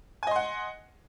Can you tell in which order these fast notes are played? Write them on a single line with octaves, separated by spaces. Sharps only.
G#5 D#5 C6 F#5